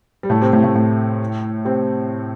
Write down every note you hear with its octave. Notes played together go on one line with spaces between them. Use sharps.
G3
A2 A3
C3 C4
A2 A3
A2 A3
A2 A3
C3 C4